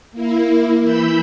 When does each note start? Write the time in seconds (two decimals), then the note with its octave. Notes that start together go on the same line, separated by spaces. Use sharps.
0.12 A#3 E4
0.80 E3 B5 E6 G6